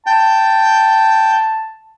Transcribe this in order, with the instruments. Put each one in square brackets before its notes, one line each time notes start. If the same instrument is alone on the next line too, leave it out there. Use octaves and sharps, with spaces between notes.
[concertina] G5 [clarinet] A5